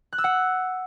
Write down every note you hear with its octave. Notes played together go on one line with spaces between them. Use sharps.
F#6
E6
F#5